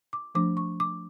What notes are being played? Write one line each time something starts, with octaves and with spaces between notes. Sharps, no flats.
D6
F3 A3 D4 D6
C#6
D6